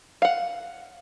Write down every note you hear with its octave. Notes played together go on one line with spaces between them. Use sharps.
F5 F#5